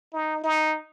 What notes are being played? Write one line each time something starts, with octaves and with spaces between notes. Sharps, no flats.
D#4
D#4